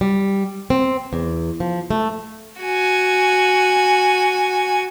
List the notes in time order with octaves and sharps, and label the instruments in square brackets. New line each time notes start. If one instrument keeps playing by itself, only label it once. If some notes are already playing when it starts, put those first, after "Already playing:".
[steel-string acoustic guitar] G3
C4
E2
F3
A3
[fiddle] F#4 G#5